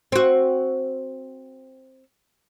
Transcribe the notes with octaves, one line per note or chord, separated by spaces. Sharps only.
C4 F#4